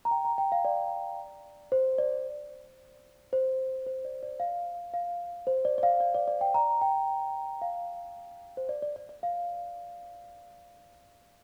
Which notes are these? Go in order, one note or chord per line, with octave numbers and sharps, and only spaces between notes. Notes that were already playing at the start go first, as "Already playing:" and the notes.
A#5
G5
A#5
G5
F5
D5
C5
D5
C5
C5
D5
D5
F5
F5
C5
D5
D5
F5
D5
D5
D5
G5
A#5
G5
F5
C5
D5
D5
D5
D5
F5